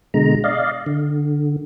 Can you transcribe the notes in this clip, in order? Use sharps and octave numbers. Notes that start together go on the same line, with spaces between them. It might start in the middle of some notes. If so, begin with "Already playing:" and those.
B2 D3 G#3 A#5
D5 D#5 F5
D3